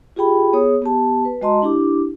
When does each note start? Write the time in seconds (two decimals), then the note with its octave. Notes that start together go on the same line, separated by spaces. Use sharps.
0.16 F4 G4 G#4 G5 B5
0.53 B3 G#4 C#5 D#6
0.82 B3 G4 A5
1.25 B4
1.41 G#3 F#4 D#5 A5 A#5 C6
1.62 D4 E4 G4 D6